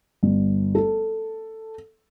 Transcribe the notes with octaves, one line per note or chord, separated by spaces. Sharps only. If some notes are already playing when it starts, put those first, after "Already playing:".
G1
A4